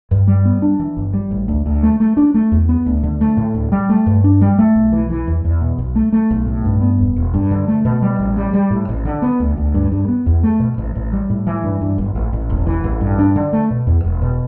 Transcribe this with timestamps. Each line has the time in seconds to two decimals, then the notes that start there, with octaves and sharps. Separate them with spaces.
0.11 G2
0.27 G3
0.45 B3
0.62 D4
0.80 E3
0.97 G1
1.14 G3
1.31 A1
1.48 D2
1.66 D2
1.83 A3
2.00 A3
2.17 D4
2.34 A3
2.52 E2
2.69 B3
2.86 D2
3.03 D3
3.21 A3
3.37 A2
3.55 D2
3.72 G3
3.89 A3
4.06 G2
4.24 D4
4.41 G3
4.58 A3
4.75 B1
4.92 E3
5.10 E3
5.27 E2
5.45 E2
5.61 B2
5.78 B1
5.95 A3
6.12 A3
6.30 B1
6.47 A2
6.64 G2
6.82 B3
6.98 E1
7.16 E1
7.34 G2
7.51 D3
7.68 A3
7.85 B2
8.02 G3
8.19 A1
8.37 G3
8.53 G3
8.70 A2
8.89 A1
9.05 D3
9.22 B3
9.40 D2
9.57 D2
9.74 G2
9.92 G2
10.08 B3
10.26 E2
10.43 A3
10.60 B2
10.78 A1
10.95 A1
11.13 G3
11.30 A2
11.47 E3
11.64 G2
11.81 G2
11.98 G1
12.15 A1
12.33 A1
12.50 E1
12.66 E3
12.84 A1
13.01 G2
13.19 D4
13.36 D3
13.53 A3
13.71 B2
13.87 E2
14.04 E1
14.22 B2